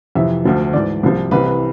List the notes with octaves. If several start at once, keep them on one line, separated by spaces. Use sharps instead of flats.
F2 C3 E3 E5
D2 D3 F3
G#2 E3 D5
C2 C3 F3
C2 C3 E3 B4
B4